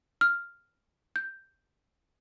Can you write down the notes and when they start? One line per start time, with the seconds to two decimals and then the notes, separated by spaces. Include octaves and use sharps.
0.21 F6
1.16 G6